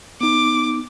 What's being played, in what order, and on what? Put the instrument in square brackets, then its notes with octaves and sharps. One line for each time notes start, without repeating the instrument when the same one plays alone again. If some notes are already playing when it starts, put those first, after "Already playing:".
[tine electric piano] B3 D#4 [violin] D6